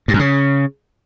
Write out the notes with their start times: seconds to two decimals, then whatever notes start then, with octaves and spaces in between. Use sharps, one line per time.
0.08 G2
0.14 F#2
0.19 C#3